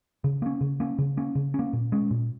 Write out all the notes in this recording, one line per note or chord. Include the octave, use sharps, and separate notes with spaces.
C#3
A#3 C#4
C#3
A#3 C#4
C#3
A#3 C#4
C#3
A#3 C#4
A#2
G#3 C#4
A#2